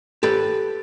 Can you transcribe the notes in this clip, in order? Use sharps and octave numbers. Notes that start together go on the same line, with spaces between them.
G4 A4 B4